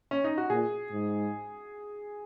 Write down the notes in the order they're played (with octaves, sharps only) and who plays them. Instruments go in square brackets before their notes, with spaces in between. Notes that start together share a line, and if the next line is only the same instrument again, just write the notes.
[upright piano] C#4
D#4
F#4
[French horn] A#2 [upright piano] G#4
[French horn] G#2